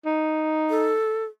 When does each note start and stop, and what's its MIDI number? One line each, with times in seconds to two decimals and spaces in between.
0.05 0.94 63
0.70 1.24 69